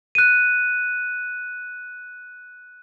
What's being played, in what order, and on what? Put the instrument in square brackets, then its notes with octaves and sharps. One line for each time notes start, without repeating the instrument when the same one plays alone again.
[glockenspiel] F#6 D#7